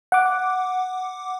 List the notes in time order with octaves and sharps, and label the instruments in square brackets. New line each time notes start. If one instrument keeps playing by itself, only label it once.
[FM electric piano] F#5 D6